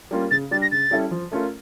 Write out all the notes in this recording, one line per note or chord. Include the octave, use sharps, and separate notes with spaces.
G3 A#3 C#4 F4
C#3 A6
G3 D4 A6
A#6
C#3 A6
G3 C#4 E4 A4
F3
A3 C#4 F4 A#4